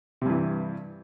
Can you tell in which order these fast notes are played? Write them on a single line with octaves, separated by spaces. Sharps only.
C3 G2 E3